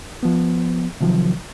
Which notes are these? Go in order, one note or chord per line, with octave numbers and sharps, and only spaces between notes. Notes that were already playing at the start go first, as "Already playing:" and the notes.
F3 B3
C3 D#3 F3 F#3